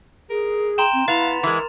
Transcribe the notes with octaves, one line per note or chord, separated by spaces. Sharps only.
G#4 A#4
G5 A#5 C6 E7
C4
B3 E4 F5 A6 F7
E3 G#3 E4 A#4